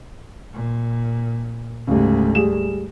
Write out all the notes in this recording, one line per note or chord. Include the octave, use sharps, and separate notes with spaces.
A#2
D2 G#2 C#3 G3
G3 G#4 E7